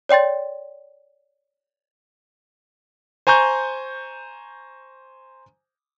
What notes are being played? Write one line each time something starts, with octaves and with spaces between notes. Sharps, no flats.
C#5 D5 G5 C6 A6
C5 G#5 A#5 C#6 G6